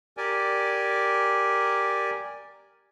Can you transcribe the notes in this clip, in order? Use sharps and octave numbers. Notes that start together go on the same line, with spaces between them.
G4 A#4 D5 G#5